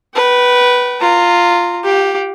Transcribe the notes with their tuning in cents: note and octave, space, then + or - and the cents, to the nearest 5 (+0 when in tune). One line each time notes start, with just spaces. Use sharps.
B4 -5 G5 -45
F4 +0 A#5 -25
G4 +0 F5 +35